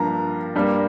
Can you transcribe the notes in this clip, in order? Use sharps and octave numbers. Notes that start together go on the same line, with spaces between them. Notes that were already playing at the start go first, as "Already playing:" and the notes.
Already playing: G2 F3 A#3 A#5
G2 G3 A#3